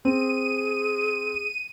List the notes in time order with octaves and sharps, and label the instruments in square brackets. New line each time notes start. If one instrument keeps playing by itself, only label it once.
[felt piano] C4 [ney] G#4 [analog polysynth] D#7